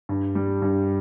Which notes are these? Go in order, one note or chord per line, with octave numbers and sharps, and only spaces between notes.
G2
G3
G2